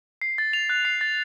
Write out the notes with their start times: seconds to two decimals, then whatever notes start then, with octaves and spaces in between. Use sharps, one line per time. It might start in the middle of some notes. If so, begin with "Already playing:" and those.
0.22 C7
0.38 A6
0.53 F7
0.70 F#6
0.85 C7
1.01 A6